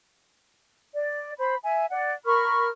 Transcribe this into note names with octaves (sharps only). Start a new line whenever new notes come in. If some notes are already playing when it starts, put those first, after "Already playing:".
D5
C5 B5
E5 G#5
D5 F#5
A#4 B5 C#6 F6